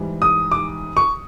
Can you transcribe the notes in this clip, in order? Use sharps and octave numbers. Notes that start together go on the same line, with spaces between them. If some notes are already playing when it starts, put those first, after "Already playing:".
Already playing: G#2 E3 G3
D#6
D6
C#6